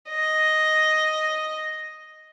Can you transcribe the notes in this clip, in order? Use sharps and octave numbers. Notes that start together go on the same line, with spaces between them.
D#5